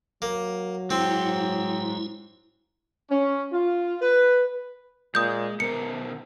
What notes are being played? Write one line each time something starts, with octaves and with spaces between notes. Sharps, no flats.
F#3 A#3
G#3 C4 E4 C5
C#4
F4
B4
A#2 G#3 D#6 G6
B2 D#3 A#4 C5 C#7